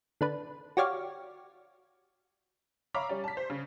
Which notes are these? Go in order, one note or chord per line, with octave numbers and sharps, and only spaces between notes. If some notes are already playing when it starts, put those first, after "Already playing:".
D3 D4 B4
F#4 G4 C#5 D5 F5
C#5 E5 F5 A#5 B5 D6
G3 C#4 D5
A5 B6
C5
C#3